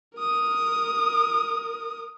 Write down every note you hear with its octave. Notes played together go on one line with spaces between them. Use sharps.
A#4 D#6